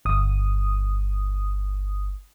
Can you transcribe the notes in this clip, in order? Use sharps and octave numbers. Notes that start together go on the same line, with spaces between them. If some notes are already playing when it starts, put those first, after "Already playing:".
G1 D#6